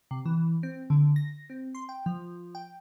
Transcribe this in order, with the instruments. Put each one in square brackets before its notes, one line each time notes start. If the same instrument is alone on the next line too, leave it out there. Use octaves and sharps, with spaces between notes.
[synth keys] C3
E3
C4
D3
A#6
C4
C6
G5
F3
G5